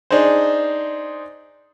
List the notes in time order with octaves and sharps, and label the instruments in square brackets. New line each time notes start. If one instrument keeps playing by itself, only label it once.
[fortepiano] D4 D#4 G#4 C5